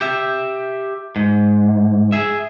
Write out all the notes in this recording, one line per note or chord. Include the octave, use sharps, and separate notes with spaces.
G4 E5
G#2
G#4 E5